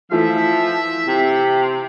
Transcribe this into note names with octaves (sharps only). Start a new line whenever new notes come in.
E3 F3 A3 F4 E5
C3